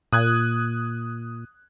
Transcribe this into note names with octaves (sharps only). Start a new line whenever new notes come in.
A#2 D#6 F#6 G#6